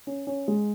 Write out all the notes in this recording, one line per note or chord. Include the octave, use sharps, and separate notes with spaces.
C#4
C#4
G#3